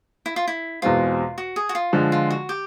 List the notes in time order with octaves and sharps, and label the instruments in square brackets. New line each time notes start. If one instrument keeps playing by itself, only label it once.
[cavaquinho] E4
F4
E4
[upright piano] E2 B2 G#3 C4 [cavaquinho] F4
[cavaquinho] F#4
G#4
F#4
F4
[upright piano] D3 F3 G#3
[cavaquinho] F4
F#4
G4